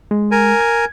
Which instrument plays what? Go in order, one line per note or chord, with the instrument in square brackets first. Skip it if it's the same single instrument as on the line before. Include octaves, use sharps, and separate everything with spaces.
[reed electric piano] G#3
[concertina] A#4 G#5
[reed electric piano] G#6